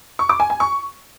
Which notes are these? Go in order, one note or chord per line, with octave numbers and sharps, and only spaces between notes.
C#6
D6
G#5
G#5
C#6